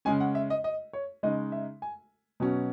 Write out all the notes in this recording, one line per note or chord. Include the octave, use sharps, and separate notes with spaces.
C#3 G#3 C#4 G#5
F#5
E5
D#5
D#5
C#5
C#3 G#3 D#4 D#5
E5
G#5
B2 F#3 C#4